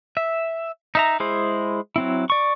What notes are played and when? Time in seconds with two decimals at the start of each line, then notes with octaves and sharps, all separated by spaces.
0.17 E5
0.95 D#4 E5 A#5
1.20 G#3 E4 G#4 C5
1.96 F#3 C4 E4
2.30 D5 C#6